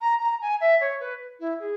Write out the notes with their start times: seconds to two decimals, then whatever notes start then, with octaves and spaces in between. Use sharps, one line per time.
0.01 A#5
0.21 A#5
0.41 G#5
0.61 E5
0.81 C#5
1.00 B4
1.40 E4
1.60 G#4